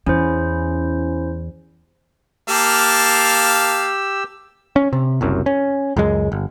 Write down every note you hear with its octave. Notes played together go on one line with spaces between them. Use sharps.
E2 C#4 E4 C5
A#3 G4 F5 A5 E6
C#4
C3
F#1 C2 F#2
C#4
C#2 F#2 G#3
G1